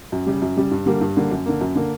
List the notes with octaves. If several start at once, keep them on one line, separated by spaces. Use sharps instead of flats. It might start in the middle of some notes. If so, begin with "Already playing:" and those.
F#2
C#3 G3
F#2
C#3 G3
G2
D3 G3 A#3
G2
D3 G3 A#3
F#2
D3 A#3
F#2
D3 A#3